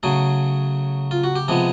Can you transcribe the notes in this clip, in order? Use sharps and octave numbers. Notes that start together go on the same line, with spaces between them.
C#3 F#3 A3 G#4
F4
F#4
G4
C3 F3 G#3 B3 G#4